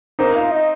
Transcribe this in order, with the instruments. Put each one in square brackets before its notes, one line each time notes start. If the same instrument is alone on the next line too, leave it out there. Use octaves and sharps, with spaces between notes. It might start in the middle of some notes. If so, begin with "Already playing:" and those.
[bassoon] A#3 [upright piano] C4 D#4
[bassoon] F4
D#4